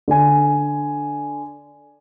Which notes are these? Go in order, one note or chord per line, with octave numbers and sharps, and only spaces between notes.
D3 G#5